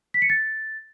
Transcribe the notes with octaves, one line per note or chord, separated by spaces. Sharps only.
B6
C#7
A6